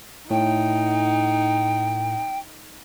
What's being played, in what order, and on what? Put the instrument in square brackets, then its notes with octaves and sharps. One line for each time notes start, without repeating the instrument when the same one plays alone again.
[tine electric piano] A2 [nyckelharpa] D#4 [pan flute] G5